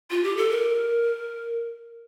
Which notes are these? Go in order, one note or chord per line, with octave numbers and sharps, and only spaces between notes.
F4
G4
A4
A#4